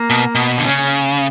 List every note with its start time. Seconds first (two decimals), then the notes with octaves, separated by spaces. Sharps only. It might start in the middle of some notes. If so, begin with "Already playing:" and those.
Already playing: A#3
0.10 B2
0.35 B2
0.58 D3
0.66 C#3 C#4